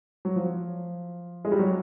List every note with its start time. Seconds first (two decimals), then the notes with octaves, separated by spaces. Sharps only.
0.25 F#3
0.36 F3
1.45 G#3
1.52 G3
1.59 F#3